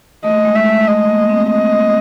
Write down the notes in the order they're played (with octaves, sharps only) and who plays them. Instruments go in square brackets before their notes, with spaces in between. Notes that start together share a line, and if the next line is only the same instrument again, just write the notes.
[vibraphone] A3 [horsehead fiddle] D#5
[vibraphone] G#3
[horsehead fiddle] E5
[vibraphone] A3
[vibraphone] A3 [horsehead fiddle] D#5
[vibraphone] A#3
C4
[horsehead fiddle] D#5